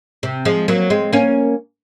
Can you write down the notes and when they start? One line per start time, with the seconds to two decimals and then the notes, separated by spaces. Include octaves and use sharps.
0.23 C3
0.45 F3 G#3
0.68 F#3 A#3
0.90 G#3 C4
1.13 A#3 C#4